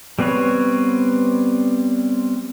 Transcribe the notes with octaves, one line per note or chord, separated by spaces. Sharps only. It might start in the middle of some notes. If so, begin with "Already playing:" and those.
G3 B3 C4 B4 C#5